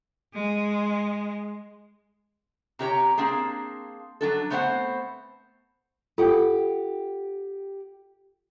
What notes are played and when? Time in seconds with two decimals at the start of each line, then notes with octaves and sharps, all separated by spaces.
0.35 G#3
2.79 C3 G4 C#5 A#5
3.18 A#3 C4 D4 G#4
4.21 F#3 D4 A4
4.50 A3 B3 C4 C5 D5 F#5
6.18 F4 G4 A4 F#5 G5